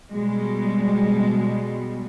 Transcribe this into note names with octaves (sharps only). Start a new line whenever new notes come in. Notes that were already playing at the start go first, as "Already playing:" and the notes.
B2 G3 G#3